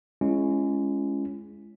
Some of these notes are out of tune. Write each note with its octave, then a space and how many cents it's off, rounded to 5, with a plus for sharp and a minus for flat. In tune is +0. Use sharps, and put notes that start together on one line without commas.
G#3 +5 C#4 +0 E4 +45